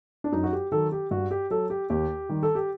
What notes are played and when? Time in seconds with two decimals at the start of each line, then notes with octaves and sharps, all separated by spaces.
0.24 D4
0.32 F#2 D#4
0.43 F#4
0.52 G4
0.72 D#3 F#3 A4
0.92 G4
1.11 G2 F#4
1.31 G4
1.50 F#3 A4
1.70 G4
1.90 D#2 G4
2.29 D#3 G3
2.43 A4
2.55 G4